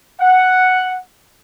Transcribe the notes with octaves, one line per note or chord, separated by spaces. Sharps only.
F#5